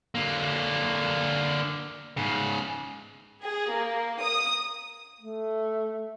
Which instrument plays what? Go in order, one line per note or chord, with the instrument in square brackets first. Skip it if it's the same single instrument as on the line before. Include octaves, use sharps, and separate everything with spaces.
[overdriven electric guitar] D3 A#3
G#2 C#3
[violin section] G#4
A#3
D#6
[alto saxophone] A3